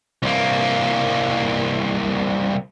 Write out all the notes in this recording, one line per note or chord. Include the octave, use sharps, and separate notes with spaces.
C2 A#3